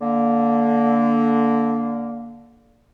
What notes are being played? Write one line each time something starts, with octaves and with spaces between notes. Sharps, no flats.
D3 A#3